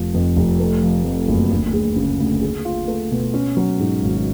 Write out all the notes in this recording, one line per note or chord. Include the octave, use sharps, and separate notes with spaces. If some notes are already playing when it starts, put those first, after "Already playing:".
Already playing: F1 F3
F2
F1
A3
F3
F2
F#1
D2
G#3
C#3
D2
G#4
F4
A3
B2
C#4
F#3
G#2
G#1